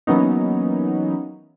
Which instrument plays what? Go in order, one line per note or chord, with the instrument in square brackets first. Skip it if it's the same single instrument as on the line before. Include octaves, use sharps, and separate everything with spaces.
[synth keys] E3 F#3 A#3 B3 C#4 D#4